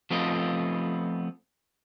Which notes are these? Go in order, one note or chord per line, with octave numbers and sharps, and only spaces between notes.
F3 A3 B3 C4 F4 D#5